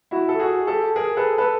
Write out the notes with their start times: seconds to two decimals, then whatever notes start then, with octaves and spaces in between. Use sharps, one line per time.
0.11 E4 F#4
0.29 A4
0.39 F#4 G#4
0.67 G4 A4
0.96 G#4 A#4
1.17 A4 B4
1.38 A4 B4